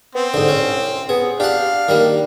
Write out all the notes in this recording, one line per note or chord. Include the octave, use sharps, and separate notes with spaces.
B3 C4
C2 G#2 D3
C#4
B3 G#4
D4 G4 F5 F#5
D#3 G3 A#3